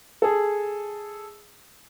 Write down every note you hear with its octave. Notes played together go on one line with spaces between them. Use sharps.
G#4 A4